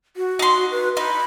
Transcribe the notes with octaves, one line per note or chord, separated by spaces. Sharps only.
F#4
D#4 C6
B4
D#4 B5